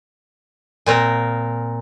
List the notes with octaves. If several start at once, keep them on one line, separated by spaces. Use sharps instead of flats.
A#2 C4 A#4